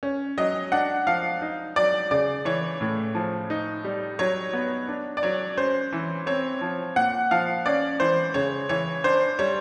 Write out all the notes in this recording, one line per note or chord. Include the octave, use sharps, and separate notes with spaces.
C#4
F#3 D#5
D4 F#5
F3 F5
D#4
F#3 D5
C#3 D5
E3 C#5
A2
F3
D#4
G3
F#3 C#5
B3
D4
D5
F#3 C#5
C#4 C5
E3
C4 C#5
F3
A#2 F#5
F3 F5
C#4 D5
E3 C5
C#3 C#5
E3 C#5
D4 C5
G3 C#5